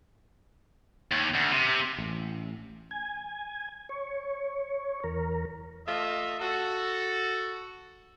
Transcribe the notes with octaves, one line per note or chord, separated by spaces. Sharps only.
D#2
D2
C3
A1
G#5
C#5
E2 A#4
A3 F4 D#5 E5
F#4 A4